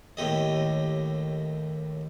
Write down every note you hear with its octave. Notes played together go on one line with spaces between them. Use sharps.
D#2 A2 G4 D#5